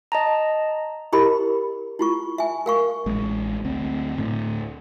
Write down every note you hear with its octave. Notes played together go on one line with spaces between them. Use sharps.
D#5 A5 A#5
E4 G4 A#4 D#5 A#5 B5
E4 F4 C#6
E5 G#5
A#4 F5 C#6
A1 G#3
D2 C4
D2 A2